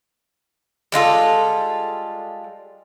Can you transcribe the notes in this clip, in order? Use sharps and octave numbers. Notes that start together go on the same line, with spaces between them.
G3 G#3 F4 A4